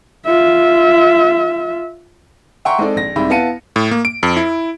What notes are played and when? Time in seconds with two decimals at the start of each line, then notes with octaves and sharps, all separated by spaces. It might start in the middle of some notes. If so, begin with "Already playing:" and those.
0.26 F4 E5
2.65 E5 F#5 G5 A#5 C6 C#6
2.78 G#3 C4 D#4 A4 D5
2.96 A#1 A#6
3.16 C2 G#2 C3 E5 B5
3.30 B3 E4 F5 A5 C#7 D#7
3.76 A2
3.91 A#3
4.05 D7
4.23 F2
4.37 E4